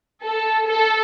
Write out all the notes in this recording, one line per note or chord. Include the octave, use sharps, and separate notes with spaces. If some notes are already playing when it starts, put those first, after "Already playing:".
A4
A4